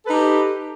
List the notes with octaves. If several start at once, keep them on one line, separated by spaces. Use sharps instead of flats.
D#4 G4 A4 B4